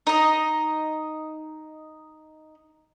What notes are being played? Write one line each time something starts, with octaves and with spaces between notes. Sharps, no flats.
D#4 D#5